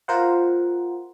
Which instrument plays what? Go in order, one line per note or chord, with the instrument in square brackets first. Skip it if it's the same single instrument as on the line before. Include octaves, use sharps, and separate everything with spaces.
[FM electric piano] F4 A#4 C5 F#5